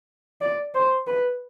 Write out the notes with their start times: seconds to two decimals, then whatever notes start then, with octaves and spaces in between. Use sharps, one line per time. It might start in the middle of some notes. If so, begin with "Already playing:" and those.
0.41 D5
0.75 C5
1.07 B4